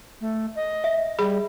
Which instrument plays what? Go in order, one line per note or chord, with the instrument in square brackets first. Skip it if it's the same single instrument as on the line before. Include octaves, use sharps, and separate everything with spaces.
[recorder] A3
D#5
[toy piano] E5
[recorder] G3 [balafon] G#4 B5